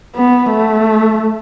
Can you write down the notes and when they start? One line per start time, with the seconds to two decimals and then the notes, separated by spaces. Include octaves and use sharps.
0.15 B3
0.50 A3